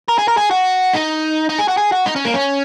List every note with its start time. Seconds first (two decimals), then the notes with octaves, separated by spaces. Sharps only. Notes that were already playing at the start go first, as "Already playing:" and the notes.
0.08 A#4
0.18 G#4
0.28 A#4
0.37 G#4
0.51 F#4
0.93 D#4
1.50 D#4
1.59 G#4
1.68 F#4
1.78 G#4
1.92 F#4
2.06 D#4
2.16 C#4
2.25 A#3
2.34 C#4